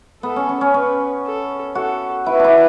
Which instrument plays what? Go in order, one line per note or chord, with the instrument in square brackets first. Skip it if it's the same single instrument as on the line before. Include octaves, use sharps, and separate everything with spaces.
[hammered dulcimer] B3 [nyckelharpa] A4
[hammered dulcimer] C#4
C#4
C#4
[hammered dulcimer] C#4 [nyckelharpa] B4
[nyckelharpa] A4
[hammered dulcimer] F#4 [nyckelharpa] A4
[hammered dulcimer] E4 [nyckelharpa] B4
[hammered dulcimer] D4 E4